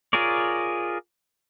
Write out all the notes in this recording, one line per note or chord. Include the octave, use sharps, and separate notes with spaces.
F4 G#4 A#4 C#5 D5